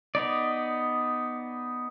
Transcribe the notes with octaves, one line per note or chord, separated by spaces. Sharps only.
B3 D#4 D5